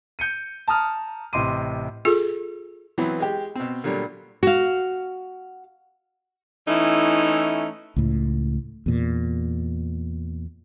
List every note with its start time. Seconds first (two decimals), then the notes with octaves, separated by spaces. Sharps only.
0.19 G6 C#7 D#7
0.68 A5 A#5 D#6 F6
1.33 A1 C3 D#5 C6 D6 D#7
2.05 F4 G#4 A4
2.98 E3 F#3 B3 C4
3.20 G#3 G4
3.56 B2 C4
3.84 A#2 D3 F#3 G3
4.43 F#4 F5
6.68 E3 A3 C#4 D#4 E4
7.96 C#2 A2
8.86 E2 A#2